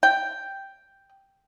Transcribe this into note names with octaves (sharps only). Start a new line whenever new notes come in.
G5